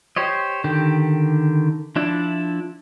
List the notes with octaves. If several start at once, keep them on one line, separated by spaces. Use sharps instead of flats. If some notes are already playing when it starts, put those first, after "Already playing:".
G4 C5 C#5 D#5
D3 D#3 G4
F3 D4 E4